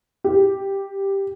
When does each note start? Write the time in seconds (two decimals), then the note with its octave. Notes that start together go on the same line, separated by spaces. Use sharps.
0.24 G4